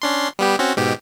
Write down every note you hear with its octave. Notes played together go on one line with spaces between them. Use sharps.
C#4 D4 C6
G3 B3 G4
C4 C#4 F#4
G#2 B2 G4